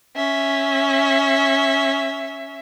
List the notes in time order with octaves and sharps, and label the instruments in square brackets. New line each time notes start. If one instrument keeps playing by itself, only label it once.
[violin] C#4 E5